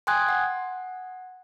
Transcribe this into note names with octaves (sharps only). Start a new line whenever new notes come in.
G5 G#5 C6 D#6 F#6 G#6
F#5